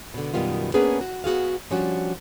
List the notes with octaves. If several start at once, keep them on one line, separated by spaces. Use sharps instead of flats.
B2 D3
F#2 B2 D#3 G3 B3 F4
A#3 B3 C#4 D4 G#4 B4
F#4
B3 F#4 G#4 F5
F3 G3 C#4 D4 F#4